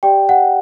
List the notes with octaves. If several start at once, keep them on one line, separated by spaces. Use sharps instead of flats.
G4 D5 G5
F#5